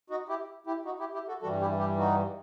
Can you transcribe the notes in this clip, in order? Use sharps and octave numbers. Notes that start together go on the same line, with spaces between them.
D#4 F#4
E4 G4
E4 G4
D#4 F#4
E4 G4
E4 G4
F#4 A4
G2 E3 G3 F#4 A4
E4 G4
E4 G4
D#4 F#4